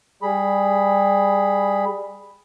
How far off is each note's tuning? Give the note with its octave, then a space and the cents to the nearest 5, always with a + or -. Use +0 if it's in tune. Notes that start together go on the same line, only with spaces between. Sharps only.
G3 +20 G#4 +0 B5 +0